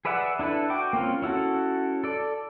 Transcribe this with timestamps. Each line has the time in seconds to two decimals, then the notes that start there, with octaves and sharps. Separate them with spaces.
0.05 G#4 B4 D5 E5 F#5
0.39 D4 E4 A4 B4
0.70 F#4 G5 D6
0.93 A#3 C4 C#4 F4
1.22 C#4 E4 F#4 A4
2.04 A4 D5